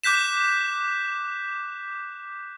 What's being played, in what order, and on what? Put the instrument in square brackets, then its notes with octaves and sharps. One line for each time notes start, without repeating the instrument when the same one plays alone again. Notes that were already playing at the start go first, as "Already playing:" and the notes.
[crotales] D6 F#6 G6 B6 E7